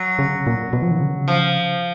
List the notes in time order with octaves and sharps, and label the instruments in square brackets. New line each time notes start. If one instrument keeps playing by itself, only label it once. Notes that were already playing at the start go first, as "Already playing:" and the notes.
Already playing: [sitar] F#3
[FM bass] C#3
A#2
B2
F3
D#3
C#3
[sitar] F3